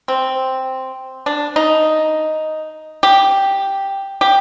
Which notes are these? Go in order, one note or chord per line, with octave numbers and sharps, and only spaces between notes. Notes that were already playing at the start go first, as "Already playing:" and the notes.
C4
D4
D#4
G4
G4